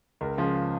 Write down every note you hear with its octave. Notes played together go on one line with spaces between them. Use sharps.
C#2 A#4
C#3 F3 G#3 A#4